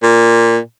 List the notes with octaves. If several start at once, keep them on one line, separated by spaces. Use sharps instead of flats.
A#2